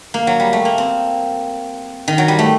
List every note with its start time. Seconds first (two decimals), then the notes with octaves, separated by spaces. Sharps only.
0.14 A#3
0.27 F#3
0.40 G3
0.53 A3
0.65 A#3
0.78 C4
2.08 D#3
2.18 F#3
2.28 G3
2.39 A3